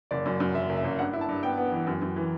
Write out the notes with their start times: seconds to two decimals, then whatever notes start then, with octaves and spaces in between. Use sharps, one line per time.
0.11 F#1 D5
0.26 F#2
0.40 F#2
0.55 F#1 E5
0.70 F#1
0.77 E5
0.85 F#1
0.99 G2 F#5
1.13 E4
1.21 A5
1.29 G2
1.43 B3 G5
1.57 B3
1.72 E3
1.87 F#2
2.02 F#2
2.16 E3